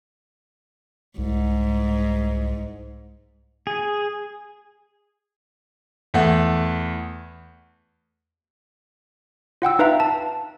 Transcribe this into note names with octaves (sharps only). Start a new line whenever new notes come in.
C2 G#2
G#4
E2 A3 F#5
F4 F#5 G5 E6
D#4 B4 E5 F5 G5 A#5
A5